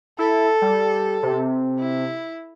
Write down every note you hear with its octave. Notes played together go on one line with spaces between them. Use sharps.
E4 A4
G3
C3
E4